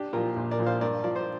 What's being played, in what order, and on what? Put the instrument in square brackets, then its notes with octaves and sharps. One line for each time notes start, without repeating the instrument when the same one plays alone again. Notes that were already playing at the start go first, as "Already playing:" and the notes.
Already playing: [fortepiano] D4 G4
A#2 F3 F4 A#4
A#1
A#4 D5
A#2 F3
C5 F5
G2 A#4 D5
F3 D5
C5